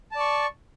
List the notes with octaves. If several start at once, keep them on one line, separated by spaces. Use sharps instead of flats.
D5 A5 C#6